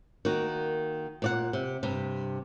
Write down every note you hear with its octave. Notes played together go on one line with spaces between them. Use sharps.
D#3 A#3 F#4
A#2 D5 F#5
C3
G2 C3